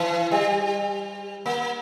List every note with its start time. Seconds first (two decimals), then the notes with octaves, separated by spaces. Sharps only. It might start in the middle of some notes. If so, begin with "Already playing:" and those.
Already playing: E3
0.31 G3
1.46 A#3